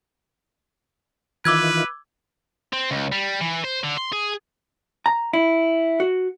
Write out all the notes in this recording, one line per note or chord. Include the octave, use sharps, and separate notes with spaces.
D#3 E3 F4 B4 D6 E6 G#6
C4
C#2
G3
E3
C5
D3
C6
G#4
A#5
E4
F#4